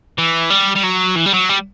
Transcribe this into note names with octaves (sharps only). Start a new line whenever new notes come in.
E3
G3
G3
F#3
E3
G3
F#3
G3